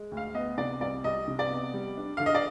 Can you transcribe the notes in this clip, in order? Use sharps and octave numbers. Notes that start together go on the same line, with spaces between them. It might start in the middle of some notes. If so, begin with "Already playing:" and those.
Already playing: G#3
D2
F5
B3 D#5
C3 D5
C2 D5
C2 D#5
C3
D5
B3
G3
D4
D3 F5
D#5
D5